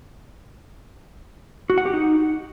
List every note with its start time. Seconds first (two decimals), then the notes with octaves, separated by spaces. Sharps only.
1.70 F#4
1.78 F#5
1.86 G4
1.94 D#4